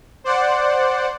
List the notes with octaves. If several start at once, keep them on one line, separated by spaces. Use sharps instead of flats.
C5 D5 F#5